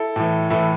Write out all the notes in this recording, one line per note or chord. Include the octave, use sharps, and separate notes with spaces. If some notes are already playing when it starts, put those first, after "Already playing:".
Already playing: E4 A4
A2 E3
A2 E3 E4 A4